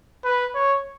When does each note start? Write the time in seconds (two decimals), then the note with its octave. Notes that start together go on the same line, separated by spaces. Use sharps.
0.24 B4
0.55 C#5